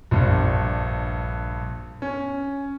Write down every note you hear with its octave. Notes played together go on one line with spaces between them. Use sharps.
A#1 G2
C#4